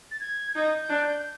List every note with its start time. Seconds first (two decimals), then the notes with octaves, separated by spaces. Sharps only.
0.11 A6
0.20 G#6
0.55 D#4 G6
0.90 D4